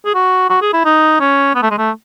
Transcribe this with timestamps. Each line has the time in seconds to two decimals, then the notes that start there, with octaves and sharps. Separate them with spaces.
0.06 G#4
0.15 F#4
0.50 F#4
0.62 G#4
0.73 E4
0.85 D#4
1.20 C#4
1.55 B3
1.62 A3
1.71 G#3
1.78 A3